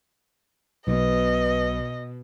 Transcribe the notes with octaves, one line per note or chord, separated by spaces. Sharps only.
B1 B2 B4 D#5